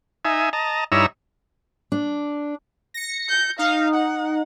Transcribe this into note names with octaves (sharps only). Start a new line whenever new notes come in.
D#4 E5 G#5
D#5 A5 A#5
G2 D#4 E4 C#5 A#5 E6
D4
A#6 C#7
G6
D#4 F5
F#5